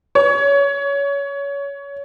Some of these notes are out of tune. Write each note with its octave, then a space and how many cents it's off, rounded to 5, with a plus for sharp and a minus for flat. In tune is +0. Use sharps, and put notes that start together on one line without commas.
C#5 +20